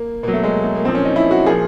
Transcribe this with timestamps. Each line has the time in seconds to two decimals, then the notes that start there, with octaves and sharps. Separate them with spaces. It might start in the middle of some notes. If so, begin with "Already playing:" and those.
Already playing: A#3
0.23 B2 A#3
0.28 F#3
0.33 A3
0.43 G#3
0.63 A3
0.75 A#3
0.84 A#2 C4
0.88 F3
0.95 C#4
1.05 D#4
1.16 E4
1.31 F#4
1.46 A#2 F3 G#4